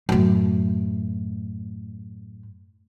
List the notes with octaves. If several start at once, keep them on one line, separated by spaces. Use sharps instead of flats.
F#2 A2